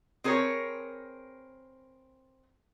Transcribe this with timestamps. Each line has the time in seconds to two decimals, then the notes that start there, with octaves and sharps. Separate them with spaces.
0.24 C4 G#4 A#4 B4 C#5